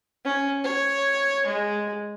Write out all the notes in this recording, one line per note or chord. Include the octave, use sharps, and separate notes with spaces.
C#4
C#5
G#3